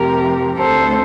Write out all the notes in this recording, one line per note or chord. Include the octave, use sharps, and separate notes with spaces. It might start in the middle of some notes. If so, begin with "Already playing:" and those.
Already playing: F2 C3 F3 A3 G4 A#4
D2 D3 A3 C4 A4 C5